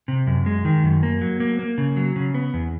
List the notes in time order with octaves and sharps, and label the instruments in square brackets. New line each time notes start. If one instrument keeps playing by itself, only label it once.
[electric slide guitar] C3
F#2
G#3
D#3
F#2
A#3
F#3
A#3
A#3
C#3
F#3
C#3
B3
E2